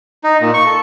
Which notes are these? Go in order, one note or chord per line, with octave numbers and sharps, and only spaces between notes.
D#4
A#2
C#6
A4